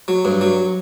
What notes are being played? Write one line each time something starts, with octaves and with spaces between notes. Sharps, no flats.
F#3
G2
F#3